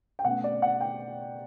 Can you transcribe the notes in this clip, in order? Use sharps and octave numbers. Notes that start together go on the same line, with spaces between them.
G5
B2 A3 C#4 F#5
D5
F#5
G5